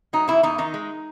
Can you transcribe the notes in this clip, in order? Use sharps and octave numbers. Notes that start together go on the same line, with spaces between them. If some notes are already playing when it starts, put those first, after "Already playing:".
F#3 D#4
E2 E4
E2 D#4
D#3 D#4
G#3